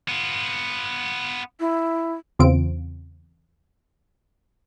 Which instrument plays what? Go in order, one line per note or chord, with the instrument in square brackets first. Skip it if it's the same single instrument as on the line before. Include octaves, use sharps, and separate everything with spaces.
[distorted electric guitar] B3 F4
[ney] E4
[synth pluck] E2 C#3 C4 F4 D7